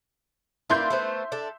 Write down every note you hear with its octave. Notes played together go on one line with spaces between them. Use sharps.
A#3 D4 B4 E5 C6 G6
A3 B3 C5
D4 A4